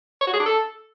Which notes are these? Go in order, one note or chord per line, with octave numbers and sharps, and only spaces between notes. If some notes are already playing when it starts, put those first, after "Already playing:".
C#5
F#4
G#4
D4
A4